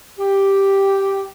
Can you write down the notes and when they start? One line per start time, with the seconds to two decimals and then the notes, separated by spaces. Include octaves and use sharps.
0.19 G4